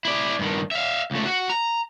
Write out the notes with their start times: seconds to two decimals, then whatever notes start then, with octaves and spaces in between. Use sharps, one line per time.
0.05 E4 D5
0.39 G2 D#3
0.71 E5 F5
1.11 C#2 A3
1.26 F#4
1.50 A#5